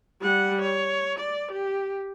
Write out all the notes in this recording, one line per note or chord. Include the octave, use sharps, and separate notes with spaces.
G3 F#5
C#5
D5
G4